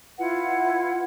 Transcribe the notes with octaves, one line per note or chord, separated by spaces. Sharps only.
E4 F4 B4 F#5